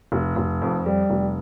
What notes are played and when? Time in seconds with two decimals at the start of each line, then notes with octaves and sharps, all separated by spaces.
0.12 F1
0.36 F1
0.62 F2
0.86 G3
1.10 F1